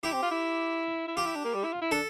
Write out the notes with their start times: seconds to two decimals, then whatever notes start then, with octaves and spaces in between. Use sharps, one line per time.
0.03 E4 G4
0.13 C4
0.23 F4
0.31 E4
1.08 E4
1.16 F4 G4
1.26 E4
1.36 D4
1.44 A#3
1.54 G3
1.64 E4
1.73 F4
1.82 E4
1.91 D4 A4